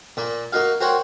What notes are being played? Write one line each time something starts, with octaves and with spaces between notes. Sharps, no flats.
A#2 A#3
A#3 D#4 F#4 F5
F#4 A#4 C5 C#5 F#5 G5